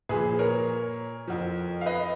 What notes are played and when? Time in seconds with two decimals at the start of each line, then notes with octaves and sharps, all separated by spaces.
0.09 A#2 F3 G#4 B4
0.39 A#4 C#5
1.27 F2 F3
1.81 F5
1.86 B4 D#5